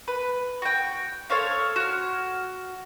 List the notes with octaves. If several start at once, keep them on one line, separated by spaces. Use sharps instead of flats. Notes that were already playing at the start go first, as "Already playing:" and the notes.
B4
F#4 G5
A4 C5 C#5 F5
F#4 F6